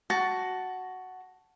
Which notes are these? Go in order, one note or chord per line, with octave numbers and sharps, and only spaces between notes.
F#4 A5